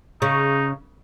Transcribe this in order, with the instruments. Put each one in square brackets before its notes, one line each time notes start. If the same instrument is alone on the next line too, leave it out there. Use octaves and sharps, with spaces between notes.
[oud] C#3 [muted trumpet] D#4